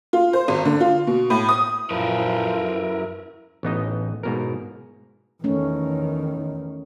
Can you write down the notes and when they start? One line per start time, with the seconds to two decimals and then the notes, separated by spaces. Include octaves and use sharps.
0.13 F4
0.33 C5
0.48 G#1
0.65 D3
0.80 F4
1.07 B2
1.30 A2
1.49 D#6
1.91 F#2 A#2 F3 E4 A#4 B4
3.63 A1 B3 D#4 D#5
4.23 G#2 B2 A#4
5.44 E2 D#3 A3 C#4